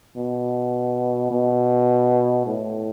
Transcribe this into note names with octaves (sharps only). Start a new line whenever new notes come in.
B2
B2
A2